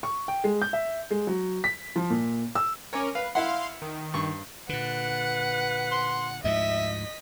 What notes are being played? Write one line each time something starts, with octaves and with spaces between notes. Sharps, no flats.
C#6
G5
G#3
G6
E5
G#3
F#3
B6
F3
A#2
E6
C#4 A#4 C#5 G#5 D6
B4 F5
E4 F5 F#5 C6
D#3
G2 C#6
A#2 D3 B4 F#5
C6
D2 G#2 F3 D#5 E5 B6